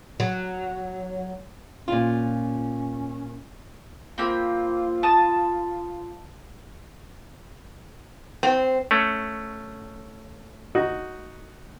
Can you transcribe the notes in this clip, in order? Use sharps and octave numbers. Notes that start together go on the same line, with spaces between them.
F#3
A#2 C#4 F4
A#3 C4 F4 B5
A5 D#6
C4
A3 C#4
D#4 F#4